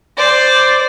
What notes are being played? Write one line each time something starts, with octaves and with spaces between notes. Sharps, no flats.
C5 D5